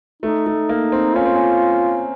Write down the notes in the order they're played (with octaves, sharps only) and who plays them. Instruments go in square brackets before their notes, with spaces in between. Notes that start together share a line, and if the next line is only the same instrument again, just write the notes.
[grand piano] A3 [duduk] D#4
[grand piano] A3
A#3
C4
[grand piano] C#4 [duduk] F4
[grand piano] C4
C#4